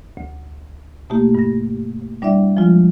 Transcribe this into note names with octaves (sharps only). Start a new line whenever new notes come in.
D2
B2 A3 A#3 E4 G4
G2 A#6
G3 D4 E4 D5 E5 F#5
F3 G#3 F4